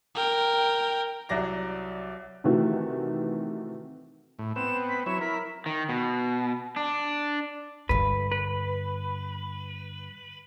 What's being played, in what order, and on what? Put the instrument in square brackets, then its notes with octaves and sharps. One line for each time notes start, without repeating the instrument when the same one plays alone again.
[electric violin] A#4 G5
[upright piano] C2 F#3 D5 A#6
[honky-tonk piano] C3 D#3 E3 A3 F#4
[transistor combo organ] A2
[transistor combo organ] B3 C4 [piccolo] E7
[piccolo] B6
[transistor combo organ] F#3 E4 C#5 [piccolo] E7
[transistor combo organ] E4 A#4 [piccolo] B6
[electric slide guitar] D#3
B2
D4
[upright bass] G2 D3 [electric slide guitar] B4
[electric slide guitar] B4